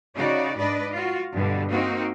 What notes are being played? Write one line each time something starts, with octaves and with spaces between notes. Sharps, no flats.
C#3 D#4 F#4 D5
G#2 D4 B4 D5 D#5
F4 F#4
G2 B2 D3
A#3 C4 D#4 F#4